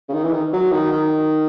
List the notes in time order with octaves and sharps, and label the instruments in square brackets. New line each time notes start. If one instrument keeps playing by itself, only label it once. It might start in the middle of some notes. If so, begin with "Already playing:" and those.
[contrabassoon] C#3
D#3
E3
D#3
F#3
D#3
D#3